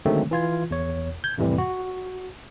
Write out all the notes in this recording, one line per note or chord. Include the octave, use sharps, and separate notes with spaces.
D3 D#3 F#3 G#3 A3 C4
E3 F4 G#6
E2 C#5
G6 G#6
F2 A2 C3 E3 G3
F#4